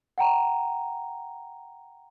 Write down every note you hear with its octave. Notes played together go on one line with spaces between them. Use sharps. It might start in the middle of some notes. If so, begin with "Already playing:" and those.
F#5 G5 A#5